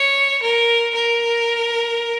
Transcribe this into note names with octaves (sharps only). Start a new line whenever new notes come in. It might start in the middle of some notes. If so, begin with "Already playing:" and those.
Already playing: C#5
A#4
A#4